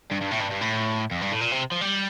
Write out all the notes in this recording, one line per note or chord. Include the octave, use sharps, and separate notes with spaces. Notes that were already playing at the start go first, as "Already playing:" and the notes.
G2
G2
A2
G2
G2
A2
F2
G2
A2
A#2
C3
F3
G3